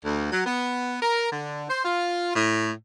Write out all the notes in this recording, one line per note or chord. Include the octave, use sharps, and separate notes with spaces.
D2
F#3
B3
A#4
D3
C5
F4
A2